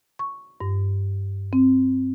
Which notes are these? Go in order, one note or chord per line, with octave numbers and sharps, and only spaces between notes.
C#6
G2
C4